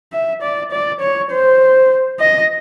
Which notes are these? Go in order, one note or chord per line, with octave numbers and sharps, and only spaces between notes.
E5
D5
D5
C#5
C5
D#5